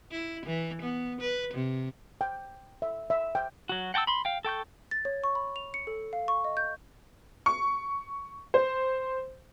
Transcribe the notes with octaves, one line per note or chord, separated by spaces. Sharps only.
E4
E3
B3
B4
C3
G5
E5
E5
G5
F#3 F#4
F#5 G5 A5 C#6 E6
B5 C6
F5 G5
A4 G5 C#6 G6
A6
C#5
C#6
B5
F7
C#7
A4
F5
C#6
D#5
G6
C#6
C5